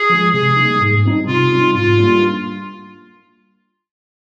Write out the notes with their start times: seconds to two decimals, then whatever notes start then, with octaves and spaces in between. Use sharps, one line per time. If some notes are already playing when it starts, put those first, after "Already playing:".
Already playing: G#4
0.10 F3 G#3
0.33 C3 G#4
0.56 G3 A#3 D#4
0.80 G#2
1.04 G3 C4 D#4
1.27 C3 F4
1.51 G3 C4 D#4
1.74 G#2 F4
1.98 G3 A#3 D4